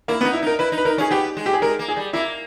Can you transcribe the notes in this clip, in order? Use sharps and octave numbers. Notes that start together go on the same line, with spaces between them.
A#3 E4
B3
D#4
E4
D#4 A#4
E4 B4
D#4
B4
D#4 A#4
C#4 G#4
B3 G4
G#3
G4
G#4
G#3 A#4
A#3
G#4
G3
A#3 E4